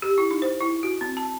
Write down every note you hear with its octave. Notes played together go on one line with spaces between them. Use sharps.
G4
E4
D#4
C5
E4
F#4
C4
A5